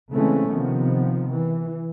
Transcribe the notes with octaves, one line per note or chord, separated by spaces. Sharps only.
C#3 E3 G#3 A3 C4 C#4
C3 D#3 F3 B3
E3